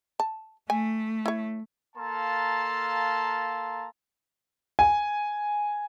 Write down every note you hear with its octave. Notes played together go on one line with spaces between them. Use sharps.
A5
A3 G#5
E4 C#5
A#3 A4 F5 A5 A#5 C6
G#5